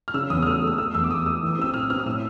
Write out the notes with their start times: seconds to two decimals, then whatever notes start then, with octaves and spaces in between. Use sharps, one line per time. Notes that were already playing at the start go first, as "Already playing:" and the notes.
0.08 F6
0.14 C#3 E6
0.30 E2 D#6
0.42 F6
0.46 A3 E6
0.62 A3
0.67 D#6
0.78 A3 E6
0.95 E2 E6
1.04 D6
1.10 E2 D#6
1.26 A3 E6
1.43 E3
1.48 D#6
1.59 C4 E6
1.74 A2 F6
1.90 C4 F6
1.99 D#6
2.06 A2 E6